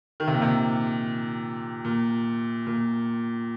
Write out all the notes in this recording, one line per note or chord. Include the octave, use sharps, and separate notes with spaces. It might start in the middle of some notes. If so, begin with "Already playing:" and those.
D#3
C3
A#2
C3
A#2
A#2